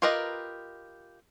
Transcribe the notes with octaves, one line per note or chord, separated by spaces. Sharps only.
F4 G4 A#4 B4 D#5